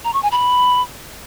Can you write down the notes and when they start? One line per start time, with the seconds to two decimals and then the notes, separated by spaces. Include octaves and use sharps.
0.04 A#5
0.13 C#6
0.23 G#5
0.32 B5